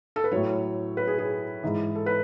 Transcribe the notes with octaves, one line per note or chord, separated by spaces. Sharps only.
A4
B4
A2 F#3 C#5
B4
G#4
G#4
G#2 E3
A4
B4